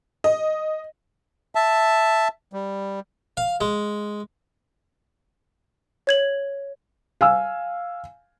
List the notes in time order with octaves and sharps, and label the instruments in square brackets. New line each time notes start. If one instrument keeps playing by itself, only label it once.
[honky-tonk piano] D#5
[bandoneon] E5 A5
G3
[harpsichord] F5
G#3
[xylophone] C#5 G#6 F#7
[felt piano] F5 G#5 E6